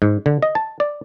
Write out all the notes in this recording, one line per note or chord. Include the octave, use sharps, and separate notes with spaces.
G#2
D3
D#5
A5
D5